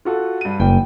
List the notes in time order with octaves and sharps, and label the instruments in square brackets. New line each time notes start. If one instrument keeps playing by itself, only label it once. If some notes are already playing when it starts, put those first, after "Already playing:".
[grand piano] F4 F#4 A4
G2 D#7
[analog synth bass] F#1 [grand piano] G5